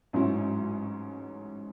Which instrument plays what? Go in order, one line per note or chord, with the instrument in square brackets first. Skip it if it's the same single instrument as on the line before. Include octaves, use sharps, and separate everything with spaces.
[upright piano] A1 G#2 F#3 C#4 E4